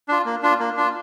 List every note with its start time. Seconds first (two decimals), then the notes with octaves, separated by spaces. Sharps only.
0.08 D4 F4
0.25 A#3
0.43 D4 F4
0.60 A#3
0.77 D4 F4